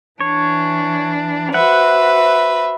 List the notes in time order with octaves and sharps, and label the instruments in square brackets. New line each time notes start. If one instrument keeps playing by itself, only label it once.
[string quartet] E3 D4 [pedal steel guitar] C#5
[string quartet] F#4 C5 [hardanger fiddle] B4 [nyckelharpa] E5 [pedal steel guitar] F#5